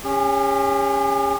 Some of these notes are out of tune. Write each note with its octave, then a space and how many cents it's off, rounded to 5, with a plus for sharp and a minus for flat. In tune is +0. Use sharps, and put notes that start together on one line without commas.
C#4 +0 G4 +45